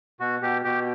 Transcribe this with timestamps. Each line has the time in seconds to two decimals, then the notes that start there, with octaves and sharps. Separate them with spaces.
0.20 B2 F#4
0.42 B2 G4
0.64 B2 G4